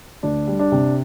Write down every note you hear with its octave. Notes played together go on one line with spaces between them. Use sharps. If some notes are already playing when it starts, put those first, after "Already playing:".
D2 D4
G3
D4
C3